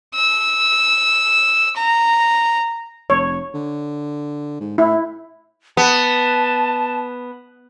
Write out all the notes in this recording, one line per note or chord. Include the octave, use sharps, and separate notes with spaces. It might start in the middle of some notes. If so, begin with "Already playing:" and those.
E6
A#5
F1 C#5
D3
G#2
A2 E4
B3 A5